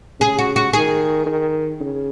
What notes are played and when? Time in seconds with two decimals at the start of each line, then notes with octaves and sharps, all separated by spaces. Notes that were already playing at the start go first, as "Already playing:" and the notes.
0.20 C#3 G#4
0.39 F#4
0.56 F#4
0.73 D#3 G#4
1.26 D#3
1.80 C#3